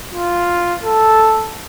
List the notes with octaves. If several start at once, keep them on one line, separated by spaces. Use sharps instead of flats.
F4
A4